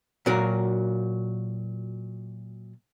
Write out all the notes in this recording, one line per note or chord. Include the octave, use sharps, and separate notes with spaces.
A#2 F#3 F#4 A#4